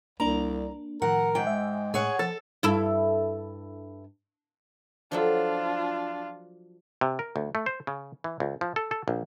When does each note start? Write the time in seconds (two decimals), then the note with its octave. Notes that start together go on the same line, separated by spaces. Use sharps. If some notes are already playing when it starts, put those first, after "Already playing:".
0.20 C2 A#3 D4 A#5
1.02 A2 D#3 F3 A#4 F#5
1.35 G#2 G5
1.47 G#3 E5
1.94 A2 G#4 C#5 F#5
2.19 F3 A4 A6
2.63 G2 E4 A4
5.12 F3 F#3 D4 F4 A4
7.01 C3
7.19 A#4
7.36 D2
7.55 A3
7.66 C5
7.87 C#3
8.24 E3
8.40 C#2
8.61 F3
8.76 A4
8.91 A4
9.08 A#1